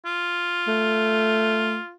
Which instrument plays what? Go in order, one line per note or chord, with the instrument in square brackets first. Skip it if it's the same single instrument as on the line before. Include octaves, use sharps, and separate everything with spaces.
[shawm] F4
[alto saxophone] A3